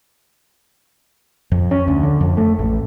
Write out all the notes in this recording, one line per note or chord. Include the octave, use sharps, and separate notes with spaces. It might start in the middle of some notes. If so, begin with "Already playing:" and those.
F2
C#4
D2
D3
F2
A3
A1